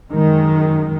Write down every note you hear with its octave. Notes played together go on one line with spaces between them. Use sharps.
F#2 D#3 G#3